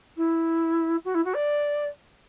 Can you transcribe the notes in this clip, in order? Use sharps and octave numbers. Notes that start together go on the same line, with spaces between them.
E4
F#4
E4
F#4
D5